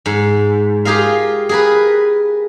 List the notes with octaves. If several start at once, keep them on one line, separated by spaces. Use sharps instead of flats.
G#2
F4 G4 G#4 A#4 F5
G#4 A#4 B4